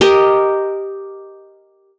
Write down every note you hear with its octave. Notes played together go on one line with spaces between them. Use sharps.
G4 A#4 D#5